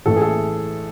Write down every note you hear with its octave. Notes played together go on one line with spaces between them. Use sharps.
A1 A2 E3 A4
G#4
A4